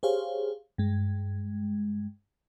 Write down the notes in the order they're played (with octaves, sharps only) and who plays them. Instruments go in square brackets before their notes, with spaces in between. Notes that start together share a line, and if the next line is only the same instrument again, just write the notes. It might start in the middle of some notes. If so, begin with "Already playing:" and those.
[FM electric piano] G4 G#4 C5 C#5 F5
G2 G#3